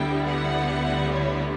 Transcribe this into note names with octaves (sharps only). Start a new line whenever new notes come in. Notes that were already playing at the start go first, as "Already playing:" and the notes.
Already playing: D2 D3 G3 B3 E4 G5
F#5
C#5